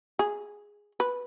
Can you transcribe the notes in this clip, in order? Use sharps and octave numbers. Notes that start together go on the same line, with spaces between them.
G#4
B4